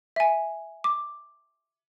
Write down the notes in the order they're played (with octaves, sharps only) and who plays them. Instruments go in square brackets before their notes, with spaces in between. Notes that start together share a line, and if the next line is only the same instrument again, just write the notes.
[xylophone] E5 G#5
D6